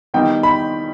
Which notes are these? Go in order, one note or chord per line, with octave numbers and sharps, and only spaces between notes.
D#3 G3 B3 D#4 G5
B5